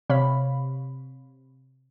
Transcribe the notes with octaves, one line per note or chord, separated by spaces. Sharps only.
C3 C#5 F5 B5